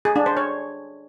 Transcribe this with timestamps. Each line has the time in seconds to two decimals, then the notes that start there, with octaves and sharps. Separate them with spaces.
0.05 G#4
0.16 D4
0.26 C5
0.37 C#5